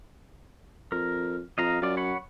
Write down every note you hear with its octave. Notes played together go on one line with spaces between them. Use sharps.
F2 A#4
F2 D#5 F5 A#5
F#2 F4 D5
C#5 F#5 B5